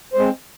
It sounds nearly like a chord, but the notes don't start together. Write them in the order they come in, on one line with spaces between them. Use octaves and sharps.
C5 G#3 C4